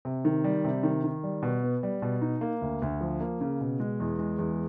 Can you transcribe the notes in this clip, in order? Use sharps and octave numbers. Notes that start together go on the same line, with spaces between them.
C3
D#3
G3
C3
D#3
D#3
G3
B2
B3
G3
B2
D#4
A#3
D2
D2
F3
A#3
C#3
B2
G#3
E2
G#3
E2